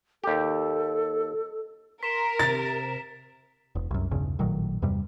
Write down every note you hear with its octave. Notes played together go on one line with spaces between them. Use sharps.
D#2 G4 A4
A#4 C6 B6 E7
C3 A6
E1
C2 F#2
B1 E2 G2 C#3
A1 A#2 D#3 F#3
E2 G2 C3 G3